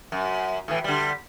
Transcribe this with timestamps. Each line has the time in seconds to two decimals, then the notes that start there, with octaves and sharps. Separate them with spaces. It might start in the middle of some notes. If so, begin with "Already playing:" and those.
0.12 F#2
0.68 A2 E3
0.84 D3 G3